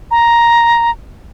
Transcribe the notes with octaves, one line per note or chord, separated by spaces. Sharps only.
A#5